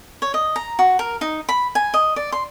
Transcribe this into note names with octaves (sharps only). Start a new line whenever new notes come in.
C#5
D#5
A#5
F#4
A#4
D#4
B5
G#5
D#5
D5
C6